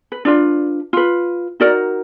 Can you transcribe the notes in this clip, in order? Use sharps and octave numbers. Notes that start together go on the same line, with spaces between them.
B4
D4 F4 B4 D5
F4 B4
D#4 F#4 A#4 D5